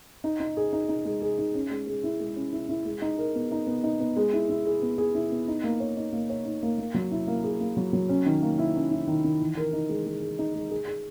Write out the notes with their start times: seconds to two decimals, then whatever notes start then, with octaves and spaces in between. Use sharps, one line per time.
0.24 D#4
0.40 D#4
0.57 G#4
0.73 D#4
0.89 D#4
1.05 G#3
1.22 G#4
1.38 D#4
1.55 C#4
1.71 G#3
1.87 G#3
2.04 E4
2.20 G#3
2.36 C#4
2.53 E4
2.69 E4
2.85 G#3
3.02 D#4
3.18 A#4
3.35 B3
3.51 D#4
3.67 B3
3.84 D#4
4.00 B3
4.17 G#3
4.33 E4
4.49 E4
4.66 G#4
4.82 B3
4.98 G#4
5.15 E4
5.31 B3
5.48 D#4
5.64 A#3
5.80 C#5
5.97 D#4
6.13 A#3
6.30 C#5
6.45 D#4
6.63 A#3
6.78 A#3
6.94 F#3
7.11 E4
7.27 A#3
7.44 G#4
7.61 A#3
7.77 F#3
7.93 F#3
8.09 C#4
8.26 D#3
8.42 A#3
8.59 E4
8.75 C#4
8.91 E4
9.07 D#3
9.24 D#3
9.41 E3
9.57 A#4
9.73 D#4
9.89 G#3
10.06 G#3
10.22 G#3
10.39 D#4
10.55 G#3
10.71 G#4
10.88 G#4